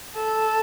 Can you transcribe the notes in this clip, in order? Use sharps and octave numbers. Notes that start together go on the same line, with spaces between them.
A4